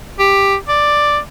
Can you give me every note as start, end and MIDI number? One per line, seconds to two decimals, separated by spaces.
0.19 0.55 67
0.69 1.19 74